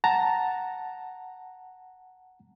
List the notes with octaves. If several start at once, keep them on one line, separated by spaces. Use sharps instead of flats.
F#5 A5 A#5